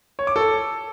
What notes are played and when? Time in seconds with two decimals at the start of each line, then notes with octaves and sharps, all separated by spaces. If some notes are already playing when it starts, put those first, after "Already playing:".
0.19 C#5
0.27 D6
0.36 A4